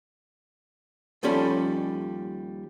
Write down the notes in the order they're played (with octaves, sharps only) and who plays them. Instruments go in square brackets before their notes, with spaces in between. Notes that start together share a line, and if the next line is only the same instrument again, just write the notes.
[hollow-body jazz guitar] D#2 F3 G3 C#4 A4 B5